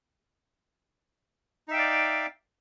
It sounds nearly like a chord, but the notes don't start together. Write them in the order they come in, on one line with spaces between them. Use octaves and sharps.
D#4 E5 G5 F5 D5